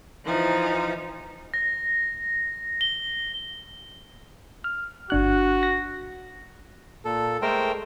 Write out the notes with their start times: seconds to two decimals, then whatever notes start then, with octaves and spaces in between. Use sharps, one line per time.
0.25 E3 F3 D#4
1.54 A#6
2.81 G7
4.64 F6
5.10 G1 D4 F#4 F#6
5.63 A#6
7.05 A#2 A4
7.42 G#3 A3 A#4 C5 G5